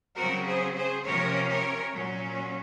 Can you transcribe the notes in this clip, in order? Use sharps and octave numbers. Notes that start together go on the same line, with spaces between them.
C#3 F#3 C4 F#4 A#4
G#4 C5
G#4 C5
C3 F3 A#3 C#4 A#4 C#5
A#4 C#5
A#2 F#3 C#4